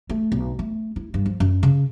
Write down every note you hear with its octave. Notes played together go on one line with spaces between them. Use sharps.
A3
B1
A3
E4
G2
F3
F#2
C#3